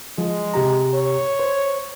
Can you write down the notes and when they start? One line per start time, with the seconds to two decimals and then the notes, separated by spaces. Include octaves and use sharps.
0.18 F3 G#3
0.54 C3 G4 A#5
0.94 C#5
1.40 C5